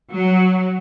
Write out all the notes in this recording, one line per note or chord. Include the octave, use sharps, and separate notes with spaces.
F#3